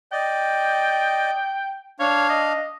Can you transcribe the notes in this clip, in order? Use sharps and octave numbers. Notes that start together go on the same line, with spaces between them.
D5 D#5 G5
D4 C#5 F5
D#5